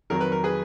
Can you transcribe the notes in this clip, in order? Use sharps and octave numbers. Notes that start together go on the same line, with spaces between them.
F2 D#3 F#3 A#4
B4
A#4
G#4 B4